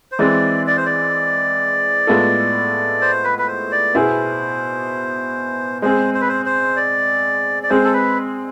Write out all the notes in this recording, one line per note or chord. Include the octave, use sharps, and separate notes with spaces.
C5
E3 G#3 C4 D5
D5
C5
D5
A2 G#3 B3 F4 A4
C5
B4
B4
C5
D5
B2 B3 E4 G#4 C5
G#3 C4 G#4 C5
C5
B4
C5
C5
D5
D5
G#3 C4 G#4 C5
A4
B4